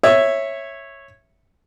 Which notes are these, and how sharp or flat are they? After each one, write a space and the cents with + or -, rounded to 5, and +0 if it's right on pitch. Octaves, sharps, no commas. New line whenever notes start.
C#5 -10 E5 +0